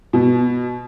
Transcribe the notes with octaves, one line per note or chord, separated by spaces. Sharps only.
B2